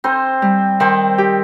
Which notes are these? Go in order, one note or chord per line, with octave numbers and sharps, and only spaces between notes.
C4 D#4 C5
G3
D#3 C4 C5
G4